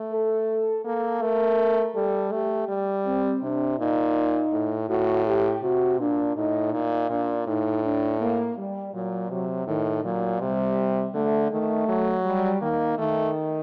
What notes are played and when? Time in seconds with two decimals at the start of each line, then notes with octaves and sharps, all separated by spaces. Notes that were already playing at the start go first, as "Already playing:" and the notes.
Already playing: A3
0.12 A4
0.85 A#3 A4
1.22 A3 A#4
1.95 G3 A4
2.32 A3 G4
2.69 G3
3.06 C4
3.42 C3 D4
3.79 A#2 D#4
4.52 A2
4.89 A2 F#4
5.25 G4
5.63 C3 F#4
5.99 A#2 D4
6.36 A2 D#4
6.72 A#2 D#4
7.10 A#2 D4
7.47 A2 D#4
7.83 D4
8.20 A#3
8.57 G3
8.94 A#2 F#3
9.30 C3 F#3
9.67 A2 D#3
10.04 A#2 F#3
10.41 C3 G3
11.14 D3 A3
11.50 D#3 A3
11.88 F#3
12.24 G3
12.61 D#3 A#3
12.97 D#3 A3